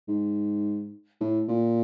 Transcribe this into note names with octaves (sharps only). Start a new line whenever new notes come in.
G#2
A2
A#2